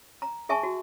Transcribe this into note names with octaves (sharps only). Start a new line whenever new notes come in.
A#5
G#4 E5 G#5 A5 C#6
F#4